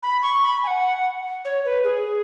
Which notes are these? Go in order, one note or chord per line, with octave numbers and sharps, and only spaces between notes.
B5
C#6
B5
G#5
F#5
C#5
B4
G#4